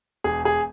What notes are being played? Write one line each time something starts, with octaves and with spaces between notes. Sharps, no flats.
E1 G#4
G#4